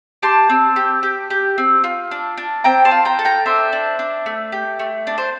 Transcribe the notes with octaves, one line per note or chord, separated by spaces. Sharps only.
G4 A5 C6
C4
G4
G4
G4
C4
F4
D4
D4
C4 G5 A#5
A5 C6
F4
G5 A#5
A4
G5 A#5
D4 C5 E5
D4
D4
A3
G4
A3
D4 D5
C5